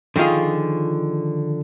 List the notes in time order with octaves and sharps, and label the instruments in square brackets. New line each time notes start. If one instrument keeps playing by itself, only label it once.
[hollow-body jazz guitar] D3 D#3 F3 F4 G#4